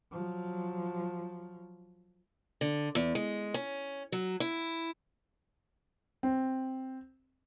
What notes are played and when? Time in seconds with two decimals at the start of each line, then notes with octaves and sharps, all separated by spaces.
0.11 F3 F#3
2.61 D3
2.95 E2
3.15 G#3
3.54 C#4
4.12 F#3
4.40 E4
6.23 C4